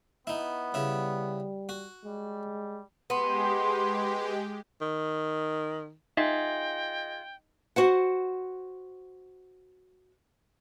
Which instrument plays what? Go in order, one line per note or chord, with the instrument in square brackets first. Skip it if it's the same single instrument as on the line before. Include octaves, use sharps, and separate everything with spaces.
[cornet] B3 [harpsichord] D#4 E4
[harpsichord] C#3 E4 [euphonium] G3
[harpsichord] F#4
[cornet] G3 [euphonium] G#3
[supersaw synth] G#3 G4 [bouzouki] B3 [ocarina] C6
[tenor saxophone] D#3
[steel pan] D#4 [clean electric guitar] F4 G#4 E5 [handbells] D#5 [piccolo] G5
[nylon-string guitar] F#4 C5 F#5